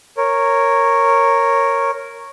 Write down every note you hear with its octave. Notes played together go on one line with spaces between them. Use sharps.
A#4 C#5